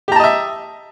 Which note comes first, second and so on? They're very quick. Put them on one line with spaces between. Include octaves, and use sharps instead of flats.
G4 A#5 A5 D#5 E5